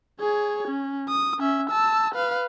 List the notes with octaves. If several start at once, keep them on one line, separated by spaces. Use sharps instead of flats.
G#4 C#5
C#4
D#6
C#4 E5
A5 E6
B4 F5